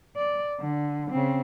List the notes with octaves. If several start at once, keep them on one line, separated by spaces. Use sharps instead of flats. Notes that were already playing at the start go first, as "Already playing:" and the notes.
D5
D3
C#3 C4